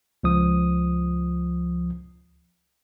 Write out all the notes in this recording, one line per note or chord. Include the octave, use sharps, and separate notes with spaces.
C#2 F3 D#6